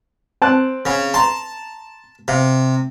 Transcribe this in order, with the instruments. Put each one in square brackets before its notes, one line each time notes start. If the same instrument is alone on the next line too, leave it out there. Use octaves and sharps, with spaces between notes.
[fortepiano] C4 A5 F#6
[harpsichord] C#3
[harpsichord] A5 [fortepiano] A#5 C6
[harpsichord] C3 [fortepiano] F5